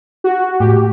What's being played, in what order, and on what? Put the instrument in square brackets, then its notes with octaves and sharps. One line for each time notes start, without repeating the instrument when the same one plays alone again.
[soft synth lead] F#4
[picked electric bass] A2 [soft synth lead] G4